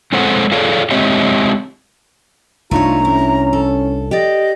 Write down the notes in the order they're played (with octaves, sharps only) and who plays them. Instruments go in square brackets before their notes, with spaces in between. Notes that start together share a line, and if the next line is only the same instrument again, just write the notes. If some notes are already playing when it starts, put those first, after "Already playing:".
[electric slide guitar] G#3 C4 A4 C5 C#5 F#5
F4 G#4 A4 C#5 D5 F5
G#3 C4 G4 C#5 D#5 E5
[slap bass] C2 F3 D4 [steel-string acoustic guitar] A3 D#4 C#5 [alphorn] F4 [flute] A#5
[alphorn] C#4 [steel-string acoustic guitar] E4
[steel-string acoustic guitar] A4
[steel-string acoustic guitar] G4 D5 [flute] D#5